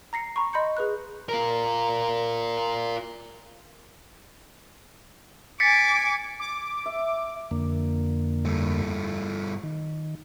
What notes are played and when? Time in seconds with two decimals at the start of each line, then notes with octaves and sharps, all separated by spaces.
0.13 A#5 A#6 C7 C#7
0.36 A#5 B5 C#6
0.53 D#5 B5 C6 G6 C#7
0.77 G#4 B4 F#6
1.29 F4 A#4
5.60 G#5 D6 A6 B6 C#7
6.40 D6
6.86 E5
7.51 F2 D3 A#3
8.45 G2 A3
9.63 D#3